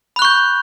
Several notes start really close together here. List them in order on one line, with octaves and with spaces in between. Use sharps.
B5 F#6 C#6 G6